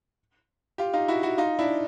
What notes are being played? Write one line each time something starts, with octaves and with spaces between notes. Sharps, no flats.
F4 G4
D#4 F4
E4 F#4
E4 F#4
D#4 F4
D4 E4